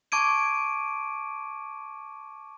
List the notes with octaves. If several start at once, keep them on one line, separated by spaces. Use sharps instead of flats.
A5 C#6 D6 G#6 D7 D#7